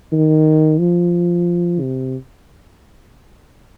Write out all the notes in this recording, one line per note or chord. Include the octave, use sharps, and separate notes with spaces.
D#3
F3
C3